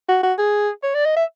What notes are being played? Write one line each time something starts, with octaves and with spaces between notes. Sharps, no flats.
F#4
F#4
G#4
C#5
D5
D#5
E5